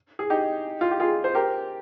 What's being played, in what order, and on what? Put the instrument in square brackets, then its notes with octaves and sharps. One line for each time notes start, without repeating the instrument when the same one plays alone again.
[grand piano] G#4
D#4 G4
F4
G4
F4 G#4
C5
G4 A#4